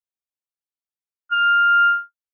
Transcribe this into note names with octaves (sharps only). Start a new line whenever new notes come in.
F6